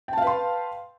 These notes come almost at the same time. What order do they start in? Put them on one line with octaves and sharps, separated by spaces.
G5 A5 F5 B4 C6